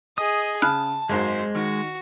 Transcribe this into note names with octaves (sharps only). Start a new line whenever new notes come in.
G#4 D#5 D#6
C#3 A5 B5 F6 F#6
G#1 G#2 F#3 G#3 C5
D#3 F#4